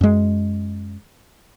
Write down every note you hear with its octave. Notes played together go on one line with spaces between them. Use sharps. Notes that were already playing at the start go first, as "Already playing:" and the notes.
F#2 G#3